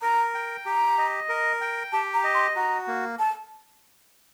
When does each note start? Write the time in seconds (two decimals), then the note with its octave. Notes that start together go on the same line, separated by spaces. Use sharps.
0.02 A#4 A#5
0.35 G5
0.65 G4 A#5
0.98 D#5
1.29 A#4
1.61 G5
1.92 G4 A5
2.14 A#5
2.24 D#5
2.34 C6
2.56 F#4 A#5
2.87 A#3
3.19 A5